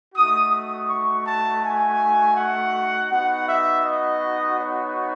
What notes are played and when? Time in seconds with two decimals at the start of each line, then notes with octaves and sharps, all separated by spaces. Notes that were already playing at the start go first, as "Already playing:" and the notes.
0.15 A3 D#4 F#4 D#6
0.52 D#6
0.89 C#6
1.26 A5
1.63 G#5
2.36 F#5
3.11 B3 D#4 F#4 F#5
3.48 E5
3.85 D#5
4.59 C#5